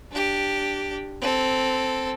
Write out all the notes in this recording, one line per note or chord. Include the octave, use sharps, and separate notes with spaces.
D4 G4
C4 A4